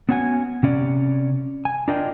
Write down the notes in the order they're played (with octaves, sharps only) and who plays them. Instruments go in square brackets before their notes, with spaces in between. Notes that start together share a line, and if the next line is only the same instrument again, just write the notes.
[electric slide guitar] B3 C#4 F#4 F#5 G#5
C3 C#4 D5
G#5
D4 F4 A#4 D5 D#5 G5